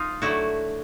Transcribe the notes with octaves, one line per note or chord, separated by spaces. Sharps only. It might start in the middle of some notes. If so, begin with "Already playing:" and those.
Already playing: D#4 F4
D3 F#3 A3 E4 F#4